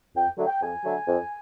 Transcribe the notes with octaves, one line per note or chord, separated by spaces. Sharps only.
F2 G5
D3 F#3 A3
G5
F2 G#5
D3 F#3 A3
F2